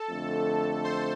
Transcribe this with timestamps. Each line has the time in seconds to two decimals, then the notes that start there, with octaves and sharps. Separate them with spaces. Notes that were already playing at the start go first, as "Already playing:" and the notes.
Already playing: A4 A5
0.09 F2 D3 A3
0.84 C5 C6